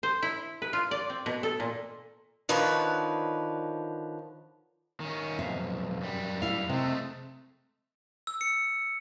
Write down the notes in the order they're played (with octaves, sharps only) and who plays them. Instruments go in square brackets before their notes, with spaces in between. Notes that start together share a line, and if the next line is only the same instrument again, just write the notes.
[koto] C5
E4
B4
F4
D5
C4
B2
A4
A#2
[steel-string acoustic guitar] D3 D#3 F3 B4 C#5 D5
[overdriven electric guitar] D#3 C#4
[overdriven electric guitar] B1 F2 [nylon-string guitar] E5 F5
[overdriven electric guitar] F#2 G3
[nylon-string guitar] E4 F5
[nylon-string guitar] C3 [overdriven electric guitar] G#3 A3
[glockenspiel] E6
C#7